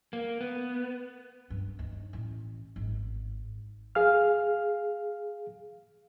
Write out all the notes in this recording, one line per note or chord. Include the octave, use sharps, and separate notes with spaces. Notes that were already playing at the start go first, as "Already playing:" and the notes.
A#3
B3
G2
D#2
A1
G#1
G#4 F5 F6